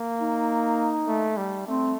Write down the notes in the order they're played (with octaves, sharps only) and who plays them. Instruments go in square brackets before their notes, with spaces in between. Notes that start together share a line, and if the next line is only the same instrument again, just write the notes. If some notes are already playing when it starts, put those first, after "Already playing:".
Already playing: [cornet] A#3
[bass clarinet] D#4
[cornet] A3
G3
[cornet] A3 [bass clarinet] C4